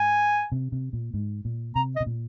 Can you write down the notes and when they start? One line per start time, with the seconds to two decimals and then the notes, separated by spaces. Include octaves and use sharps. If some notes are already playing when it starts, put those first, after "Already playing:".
Already playing: G#2 G#5
0.52 C3
0.72 C3
0.93 A#2
1.14 G#2
1.45 A#2
1.76 C3 A#5
1.96 D#5
2.00 C3
2.06 A#2